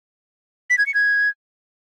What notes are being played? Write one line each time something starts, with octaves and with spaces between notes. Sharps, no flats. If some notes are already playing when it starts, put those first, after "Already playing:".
B6
G#6
C#7
G#6